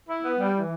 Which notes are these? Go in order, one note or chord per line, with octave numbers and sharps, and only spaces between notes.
E4
B3
G3
E3